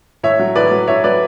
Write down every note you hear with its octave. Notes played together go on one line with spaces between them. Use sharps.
A2 C#5 E5
F#3
A2 B4 D5
F#3
A2 C#5 E5
F#3 B4 D5